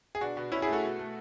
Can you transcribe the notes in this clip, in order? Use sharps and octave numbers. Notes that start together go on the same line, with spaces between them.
G#4
B2 D4 F#4
B2
B2 C#4 E4
E4 G#4
A3
F#4 A4
B2
A3